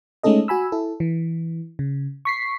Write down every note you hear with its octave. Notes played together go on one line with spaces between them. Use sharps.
G#3 A3 C#4 D#4 A4 D#5
F#4 G#5 B5 E6
E4 A4
E3
C#3
C#6 B6 C7